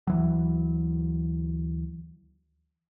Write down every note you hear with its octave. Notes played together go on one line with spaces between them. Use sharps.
D2 E3 F#3